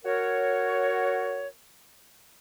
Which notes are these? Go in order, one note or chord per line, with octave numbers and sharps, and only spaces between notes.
F#4 A#4 C#5